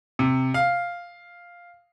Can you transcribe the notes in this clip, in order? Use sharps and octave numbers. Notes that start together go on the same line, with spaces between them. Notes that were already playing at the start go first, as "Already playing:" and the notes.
C3
F5